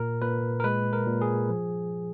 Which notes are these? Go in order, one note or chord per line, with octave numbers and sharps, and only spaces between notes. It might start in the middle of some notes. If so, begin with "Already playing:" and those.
Already playing: A#2 A#4
A#2 B4
A#4
G#3 B4
A#4
A#2
G#4
F3